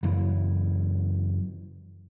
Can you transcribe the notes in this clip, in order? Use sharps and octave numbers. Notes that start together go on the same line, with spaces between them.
F#1 F#2 E3